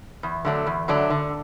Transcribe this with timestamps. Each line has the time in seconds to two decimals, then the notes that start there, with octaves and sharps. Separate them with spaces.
0.23 E2
0.45 D3 F#3 A3 D4
0.66 E2
0.88 D3 F#3 A3 D4
1.10 D3